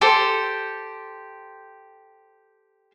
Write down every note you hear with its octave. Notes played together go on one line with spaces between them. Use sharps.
G4 A4 C5 C6